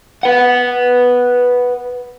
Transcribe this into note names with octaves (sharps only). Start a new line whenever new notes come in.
B4 F#5